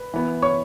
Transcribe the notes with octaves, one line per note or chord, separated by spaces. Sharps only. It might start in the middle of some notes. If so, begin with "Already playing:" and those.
Already playing: B4
E3 B3
C#5 C#6